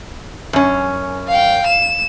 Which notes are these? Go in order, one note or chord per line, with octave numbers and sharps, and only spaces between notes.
F#2 C#4
F5 G5
E7